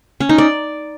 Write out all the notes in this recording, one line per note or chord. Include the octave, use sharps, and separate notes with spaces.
C#4
D#4
D5